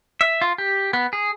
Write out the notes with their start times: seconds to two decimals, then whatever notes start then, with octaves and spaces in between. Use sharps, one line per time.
0.21 E5
0.42 F4
0.58 G4
0.93 B3
1.13 G#4